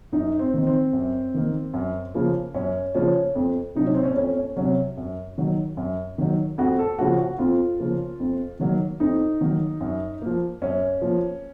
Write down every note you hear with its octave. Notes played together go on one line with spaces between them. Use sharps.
F#2 D#4
C4
D#3 A#3
C4
F#2
D#3 A#3
F#2
C#3 F3 A#3
F#2 C#4
C#3 F3 A#3 C#4
F2
C3 F#3 D#4
C#4
C4
C#4
F2 C#4
C#4
C3 F#3 C#4
F#2
D#3 F#3
F#2
D#3 F#3
F2 F#4
A4
C#3 F3 A#3 F#4
F#4
F2 F4
C#3 F3 A#3
F2
D#3 F#3 A#3
F2 D#4
D#3 F#3 A#3
F#2
F3 A#3
F#2 C#4
F3 A#3